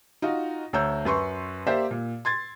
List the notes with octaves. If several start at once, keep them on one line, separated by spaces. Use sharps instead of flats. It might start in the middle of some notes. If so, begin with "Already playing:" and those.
D#4 F4 F#4
D2 C#5 A#5 E6 G6
F#2 B4 C6 C#6
A#3 G4 C5 D5 E5
A#2
C6 G#6 A6